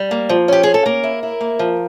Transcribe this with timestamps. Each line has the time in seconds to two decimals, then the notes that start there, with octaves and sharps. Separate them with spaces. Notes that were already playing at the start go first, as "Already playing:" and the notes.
Already playing: G3
0.11 A#3
0.29 F3
0.48 C#4 G4
0.63 C#4 G#4
0.74 A4
0.86 A#3 A#4
1.03 E4
1.23 E4
1.41 A#3
1.59 F3